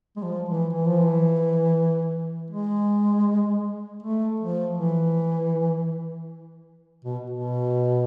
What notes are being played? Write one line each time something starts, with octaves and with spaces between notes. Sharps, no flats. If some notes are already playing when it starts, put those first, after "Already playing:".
G#3
F3
E3
E3
F3
E3
G#3
A3
F3
E3
B2
B2